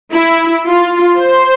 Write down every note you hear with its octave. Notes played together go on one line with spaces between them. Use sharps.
E4
F4
C5